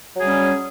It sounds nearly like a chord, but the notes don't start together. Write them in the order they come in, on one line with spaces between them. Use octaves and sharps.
F#3 G#4 G3 C#4